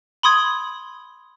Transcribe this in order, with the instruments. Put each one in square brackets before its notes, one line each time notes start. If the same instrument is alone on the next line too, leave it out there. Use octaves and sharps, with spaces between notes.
[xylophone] B5 C6 D#6 G#6